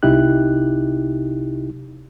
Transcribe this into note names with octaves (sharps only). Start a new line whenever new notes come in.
C2 C3 D#4 E4 G4 F#6